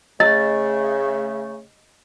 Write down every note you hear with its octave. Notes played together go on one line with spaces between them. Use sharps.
C#3 A3 D#5